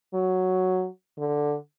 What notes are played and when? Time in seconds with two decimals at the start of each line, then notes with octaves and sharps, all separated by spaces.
0.14 F#3
1.18 D3